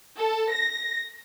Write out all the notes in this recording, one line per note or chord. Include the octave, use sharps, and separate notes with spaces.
A4
A#6